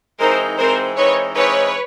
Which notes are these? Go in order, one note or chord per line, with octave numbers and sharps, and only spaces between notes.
E3 G#3 C4 D#4 A#4 C5
E3 G#3 C4 D#4 A#4 C5
E3 G#3 C4 D#4 B4 C#5
E3 G#3 C4 D#4 B4 C#5